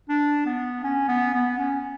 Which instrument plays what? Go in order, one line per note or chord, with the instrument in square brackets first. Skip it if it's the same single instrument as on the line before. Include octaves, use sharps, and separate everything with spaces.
[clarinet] D4
B3
C#4
B3
B3
C#4